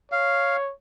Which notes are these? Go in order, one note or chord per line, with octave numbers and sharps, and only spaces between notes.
C#5 F5